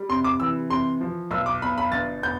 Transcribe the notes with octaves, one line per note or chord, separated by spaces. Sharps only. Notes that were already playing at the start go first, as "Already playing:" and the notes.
Already playing: G3
C3 C6
D6
E3 E6
C3 C6
F3
B1 E6
D6
B2 B5
B5
G1 A6
B3 G6